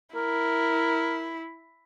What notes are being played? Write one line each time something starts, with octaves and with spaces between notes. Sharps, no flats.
E4 A#4